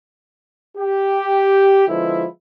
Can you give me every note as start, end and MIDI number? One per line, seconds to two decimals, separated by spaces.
0.78 1.87 67
1.88 2.26 50
1.88 2.26 53
1.88 2.26 56
1.88 2.26 59
1.88 2.26 64